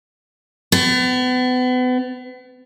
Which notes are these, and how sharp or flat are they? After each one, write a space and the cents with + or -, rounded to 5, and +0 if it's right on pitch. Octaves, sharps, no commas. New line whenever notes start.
B3 +35